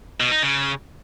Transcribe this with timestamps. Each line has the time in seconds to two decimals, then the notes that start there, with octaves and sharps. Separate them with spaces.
0.20 B2
0.31 D#4
0.42 C#3